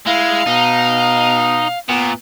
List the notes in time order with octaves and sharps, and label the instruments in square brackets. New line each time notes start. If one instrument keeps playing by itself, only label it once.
[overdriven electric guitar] G#3 [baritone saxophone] E4 [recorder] F5
[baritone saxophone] B2 [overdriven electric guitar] D#4
[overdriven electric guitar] A#2 [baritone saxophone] B3